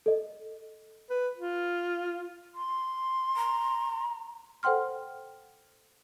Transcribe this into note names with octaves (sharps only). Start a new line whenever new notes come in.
A4 D#5
B4
F4
C6
A#5
A4 C5 F#5 G5 C6 F6